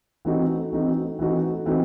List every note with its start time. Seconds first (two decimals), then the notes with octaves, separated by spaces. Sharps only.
0.25 E3 A3 C4 D#4 F#4
0.72 E3 A3 C4 D#4 F#4
1.19 E3 A3 C4 D#4 F#4
1.66 E3 A3 C4 D#4 F#4